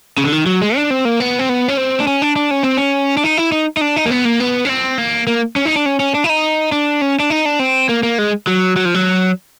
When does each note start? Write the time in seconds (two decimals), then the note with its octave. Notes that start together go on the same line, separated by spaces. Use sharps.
0.18 C#3
0.24 D3
0.32 D#3
0.46 F#3
0.61 G#3
0.76 D4
0.90 C4
1.05 A#3
1.20 B3
1.39 C4
1.49 B3
1.68 C#4
1.77 C4
2.00 D4
2.07 C#4
2.22 D4
2.36 D4
2.51 C#4
2.63 C4
2.77 C#4
3.17 D4
3.24 D#4
3.37 E4
3.52 D#4
3.77 D#4
3.81 D4
3.96 D#4
4.06 A#3
4.11 B3
4.25 A#3
4.40 B3
4.65 C#4
4.69 C4
4.98 A#3
5.27 A#3
5.56 C#4
5.66 D#4
5.76 D4
5.86 C#4
6.00 C#4
6.14 D4
6.24 E4
6.29 D#4
6.72 D4
7.01 C#4
7.20 D4
7.30 D#4
7.45 D4
7.59 C4
7.89 A#3
8.03 A#3
8.18 G#3
8.47 F#3
8.76 F#3
8.85 F3
8.94 F#3